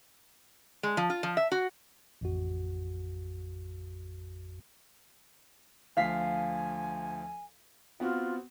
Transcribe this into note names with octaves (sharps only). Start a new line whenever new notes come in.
G#3
F3
F4
F3
E5
F#4
A1 F2 F#4
D2 F3 F5 G#5 B6 C7
B3 C4 F4 F#4